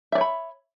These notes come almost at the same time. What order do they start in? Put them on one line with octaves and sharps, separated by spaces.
E5 D5 C#5 B5